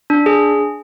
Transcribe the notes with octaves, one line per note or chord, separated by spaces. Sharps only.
D4
G#4